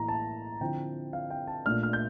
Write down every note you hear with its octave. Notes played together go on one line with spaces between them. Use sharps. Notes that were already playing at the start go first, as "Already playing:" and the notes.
Already playing: A2 E3 A#3 A#5
A5
D3 F3 C4 E4 G5
F5
G5
A5
A#2 A3 D4 F6
F6
G6